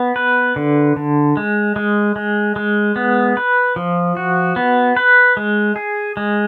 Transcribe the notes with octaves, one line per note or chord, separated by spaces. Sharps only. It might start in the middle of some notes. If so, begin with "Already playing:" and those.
Already playing: B3
B4
D3
D3
G#3
G#3
G#3
G#3
B3
B4
F3
F#4
B3
B4
G#3
G#4
G#3